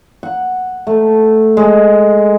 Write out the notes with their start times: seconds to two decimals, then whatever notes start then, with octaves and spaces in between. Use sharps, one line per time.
0.23 F#5
0.87 A3
1.57 G#3